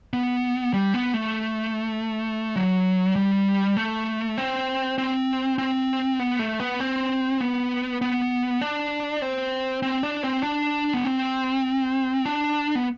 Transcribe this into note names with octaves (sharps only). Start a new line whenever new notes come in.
B3
G3
B3
A3
F#3
G3
A3
C4
C4
C4
B3
A3
B3
C4
B3
B3
D4
C4
C4
D4
C4
D4
B3
C4
D4
B3